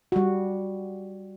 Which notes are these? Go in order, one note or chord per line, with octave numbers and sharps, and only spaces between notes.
G3 F#4